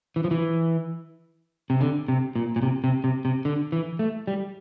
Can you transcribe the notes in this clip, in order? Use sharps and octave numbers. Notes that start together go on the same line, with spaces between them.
E3
F3
E3
C3
D3
C3
A#2
A#2
C3
C3
C3
C3
D3
E3
A3
G3